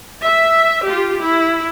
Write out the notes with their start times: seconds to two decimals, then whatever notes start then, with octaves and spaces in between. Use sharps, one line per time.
0.23 E5
0.86 F4 G4
1.20 E4